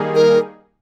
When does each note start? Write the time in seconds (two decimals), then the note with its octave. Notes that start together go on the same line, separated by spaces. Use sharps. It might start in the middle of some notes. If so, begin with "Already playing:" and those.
Already playing: D#3 G3 A#3 D#4 G#4
0.15 A#4